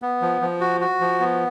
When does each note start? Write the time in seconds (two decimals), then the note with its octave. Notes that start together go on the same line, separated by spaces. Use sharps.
0.02 B3
0.22 F3
0.42 F3
0.61 F#4
0.81 F#4
1.00 F3
1.20 B3